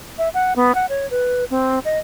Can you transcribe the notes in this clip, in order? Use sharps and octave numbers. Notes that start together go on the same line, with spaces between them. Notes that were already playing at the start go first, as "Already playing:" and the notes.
E5
F#5
B3
F#5
C#5
B4
C4
D#5